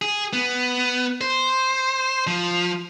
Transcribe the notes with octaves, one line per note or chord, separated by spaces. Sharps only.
G#4
B3
C5
F3